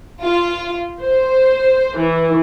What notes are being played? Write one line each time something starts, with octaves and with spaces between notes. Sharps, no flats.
F4
C5
E3